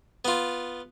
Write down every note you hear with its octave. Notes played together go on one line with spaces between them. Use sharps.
B3 F4